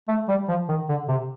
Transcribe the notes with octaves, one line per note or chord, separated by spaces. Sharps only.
A3
G3
F3
D#3
D3
C3